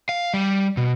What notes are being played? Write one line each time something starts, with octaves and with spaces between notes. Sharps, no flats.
F5
G3
B2